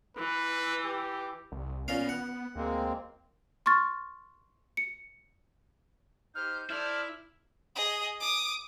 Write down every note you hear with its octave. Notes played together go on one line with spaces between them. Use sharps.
E3 B4
G4
C2
A#2 B3 C#4 F5
F#5
D2 G#3 A#3 C4
C6 C#6 F6 A6
C#7
D#4 G4 C5 F6 G6
E4 A4 C5 D5 F6
G#4 D#5
D6 D#6